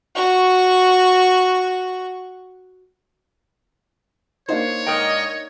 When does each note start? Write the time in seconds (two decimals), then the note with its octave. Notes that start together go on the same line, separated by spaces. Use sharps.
0.15 F#4 C#6
4.49 A#3 D4 D#4 C5 C#5
4.87 G#2 A#4 D#5 G5